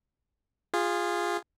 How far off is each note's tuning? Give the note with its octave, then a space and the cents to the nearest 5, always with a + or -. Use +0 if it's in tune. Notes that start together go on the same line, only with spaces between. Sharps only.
F4 +0 G#4 -20